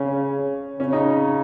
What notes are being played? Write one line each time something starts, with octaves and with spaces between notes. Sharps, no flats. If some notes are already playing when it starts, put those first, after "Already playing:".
Already playing: C#3 C#4
C#3 C#4
D#4